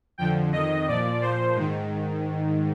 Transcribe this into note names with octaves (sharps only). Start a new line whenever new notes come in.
F2 D3 F3 G5
F2 D#3 D#5
A#2 F3 D5
A#2 F3 C5
G#2 D#3